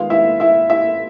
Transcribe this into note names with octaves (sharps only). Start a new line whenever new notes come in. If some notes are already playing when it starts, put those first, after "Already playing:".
Already playing: D#3 G#3 B3 F4 F5
E4 E5
E4 E5
E4 E5